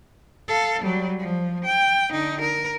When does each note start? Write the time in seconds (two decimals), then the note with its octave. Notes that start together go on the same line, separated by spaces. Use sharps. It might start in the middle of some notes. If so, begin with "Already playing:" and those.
0.48 A4 F5
0.82 F#3 G3
1.19 F3
1.65 G5
2.12 D3 D#4
2.41 A#4